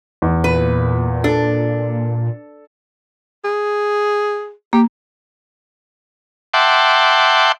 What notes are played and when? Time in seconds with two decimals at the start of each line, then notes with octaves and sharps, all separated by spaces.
0.22 E2
0.44 A#2 B4
1.24 D4 A4
3.44 G#4
4.73 A#3 G4
6.54 E5 F#5 G5 A5 C6 D6